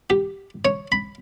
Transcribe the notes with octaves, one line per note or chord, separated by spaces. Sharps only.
G4
C#5
B5